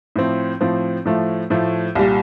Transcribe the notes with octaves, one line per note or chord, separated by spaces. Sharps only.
A2 F3 C4
A2 F3 C4
A2 F3 A3
A2 F3 A3
C2 A#2 G3